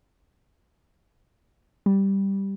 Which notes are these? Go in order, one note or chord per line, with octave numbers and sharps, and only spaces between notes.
G3